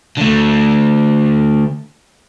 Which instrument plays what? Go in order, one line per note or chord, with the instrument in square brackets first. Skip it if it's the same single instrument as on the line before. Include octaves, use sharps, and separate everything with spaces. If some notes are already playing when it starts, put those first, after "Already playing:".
[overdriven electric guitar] D3 A3